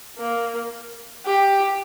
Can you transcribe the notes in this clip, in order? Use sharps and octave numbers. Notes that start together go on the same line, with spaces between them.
A#3
G4